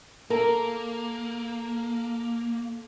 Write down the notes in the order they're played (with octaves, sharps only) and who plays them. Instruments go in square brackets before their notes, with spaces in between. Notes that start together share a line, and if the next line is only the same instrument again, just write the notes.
[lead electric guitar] A#3 [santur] A4 A#5 [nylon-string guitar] A#4